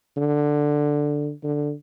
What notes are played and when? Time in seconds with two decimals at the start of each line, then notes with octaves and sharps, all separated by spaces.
0.17 D3
1.43 D3